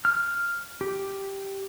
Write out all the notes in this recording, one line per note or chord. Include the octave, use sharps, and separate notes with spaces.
F6
G4